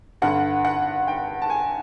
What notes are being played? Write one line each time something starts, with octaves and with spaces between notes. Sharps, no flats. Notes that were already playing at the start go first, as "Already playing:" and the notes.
G2 D3 F#5
F#5
G5
A5
G#5